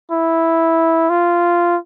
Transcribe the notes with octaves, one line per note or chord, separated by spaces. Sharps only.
E4
F4